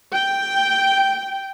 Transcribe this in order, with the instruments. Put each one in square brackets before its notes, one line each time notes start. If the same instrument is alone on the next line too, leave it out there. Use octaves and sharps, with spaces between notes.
[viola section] G5